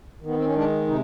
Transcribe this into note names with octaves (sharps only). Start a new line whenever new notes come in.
D#3
B3
C4
C#4
G#3 D4
C3 D#4